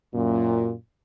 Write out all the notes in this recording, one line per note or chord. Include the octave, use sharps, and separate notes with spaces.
F#2 A#2